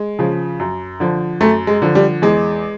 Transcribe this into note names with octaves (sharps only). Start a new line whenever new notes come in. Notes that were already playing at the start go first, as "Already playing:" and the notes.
Already playing: G#3
C#3 F3
F#2
D3 F3
F#2 A3
G#3
D3 F3
G3
E2 G#3